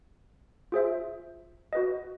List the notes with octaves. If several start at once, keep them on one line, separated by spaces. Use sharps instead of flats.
F4 G#4 C5 E5
F#4 B4 D#5